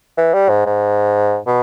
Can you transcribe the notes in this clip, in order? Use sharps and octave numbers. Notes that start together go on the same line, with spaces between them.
E3
G3
G#2
G#2
B2